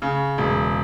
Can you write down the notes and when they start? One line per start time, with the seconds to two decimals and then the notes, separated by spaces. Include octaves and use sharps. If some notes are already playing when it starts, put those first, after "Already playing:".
0.02 C#3
0.38 E1